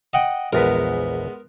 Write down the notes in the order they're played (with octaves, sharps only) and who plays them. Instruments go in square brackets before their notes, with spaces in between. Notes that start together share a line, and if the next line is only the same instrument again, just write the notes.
[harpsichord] D#5 F#5 G5
[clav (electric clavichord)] A#1 E2 B4 [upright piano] G#3 B3 [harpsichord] A#4